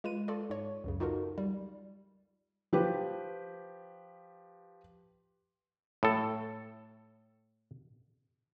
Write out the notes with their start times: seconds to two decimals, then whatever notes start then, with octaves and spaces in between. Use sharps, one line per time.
0.04 G#3 F4 B4 D#7
0.28 F4 A4 D5
0.50 G#2 C#5
0.84 C#2 F#2 C#3
1.00 D#4 F4 F#4 A4 A#4
1.38 G3
2.73 F3 G4 B4
6.03 A2 A4